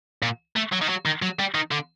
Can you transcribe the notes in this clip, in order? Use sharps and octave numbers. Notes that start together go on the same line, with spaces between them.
A#2
A3
F#3
D#3
F#3
D#3
F#3
G3
D#3
D3